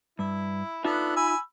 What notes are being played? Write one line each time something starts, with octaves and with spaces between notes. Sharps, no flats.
G2 E4
B3 D4 D#4 F4 A4 E5
G#5 B5 E6